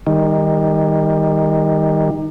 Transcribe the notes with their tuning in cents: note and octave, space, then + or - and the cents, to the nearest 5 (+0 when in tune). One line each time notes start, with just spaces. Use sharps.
D#3 +5 G3 +25